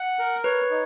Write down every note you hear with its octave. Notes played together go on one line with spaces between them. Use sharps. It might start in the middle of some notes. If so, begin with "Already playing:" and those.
Already playing: F#5
A#4
B4 C#5
D#4